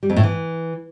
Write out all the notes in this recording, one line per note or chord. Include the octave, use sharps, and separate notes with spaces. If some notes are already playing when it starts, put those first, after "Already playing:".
G3
F2
A2
E3